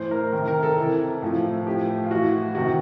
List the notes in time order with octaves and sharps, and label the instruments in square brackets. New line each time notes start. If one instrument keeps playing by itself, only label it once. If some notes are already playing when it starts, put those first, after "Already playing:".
Already playing: [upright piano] A2 E3 C5
A#4
C3 D#3 A#4
A#4
A4
C3 E3
A2 F3
A2 F3 G4
F4
A2 E3 F#4
C3 D#3 F#4